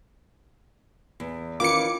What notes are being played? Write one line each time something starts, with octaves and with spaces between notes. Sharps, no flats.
E2
D#3 E3 C#4 F4 A#4 F5 D6 C#7